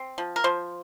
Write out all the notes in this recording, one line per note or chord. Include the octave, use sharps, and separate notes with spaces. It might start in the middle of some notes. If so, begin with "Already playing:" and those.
Already playing: C4
F3
A#4
F3 C5